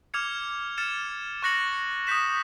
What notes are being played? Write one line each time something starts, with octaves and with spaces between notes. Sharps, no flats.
D6 F6 G#6 C#7 F7
F6 A6 C#7 E7
C#6 F#6 A#6 C#7 F#7
D#6 G6 B6 E7